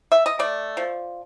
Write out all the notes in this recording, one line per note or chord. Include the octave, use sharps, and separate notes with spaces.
E5
D#5
A3 D5
F3